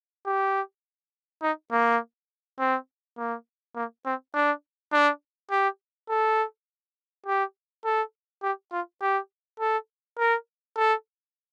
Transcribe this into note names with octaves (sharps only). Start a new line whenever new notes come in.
G4
D#4
A#3
C4
A#3
A#3
C4
D4
D4
G4
A4
G4
A4
G4
F4
G4
A4
A#4
A4